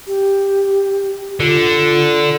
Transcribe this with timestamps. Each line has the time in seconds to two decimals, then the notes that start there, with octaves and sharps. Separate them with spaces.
0.07 G4
1.40 D3 F4